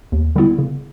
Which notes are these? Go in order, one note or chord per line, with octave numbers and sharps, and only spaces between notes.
D#2
D3 G3 B3 E4
C#3